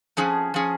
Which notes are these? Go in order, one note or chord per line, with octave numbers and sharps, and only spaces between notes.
F2 F3 C#4 G#4
F3 C#4 G#4